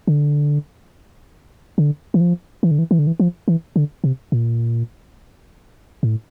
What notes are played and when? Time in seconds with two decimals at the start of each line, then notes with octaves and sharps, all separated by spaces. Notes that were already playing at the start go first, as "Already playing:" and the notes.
0.07 D3
1.78 D3
2.14 E3
2.20 F3
2.63 E3
2.71 D3
2.79 E3
2.91 E3
2.99 D3
3.07 E3
3.20 F3
3.48 E3
3.76 D3
4.04 C3
4.32 A#2
6.03 A2